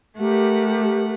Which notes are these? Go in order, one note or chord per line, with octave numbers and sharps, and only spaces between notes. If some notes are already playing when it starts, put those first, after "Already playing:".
A3 G4 A#4 F#5